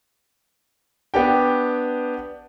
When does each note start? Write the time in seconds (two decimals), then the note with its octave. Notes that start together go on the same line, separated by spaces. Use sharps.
1.14 B3 D4 G4 G5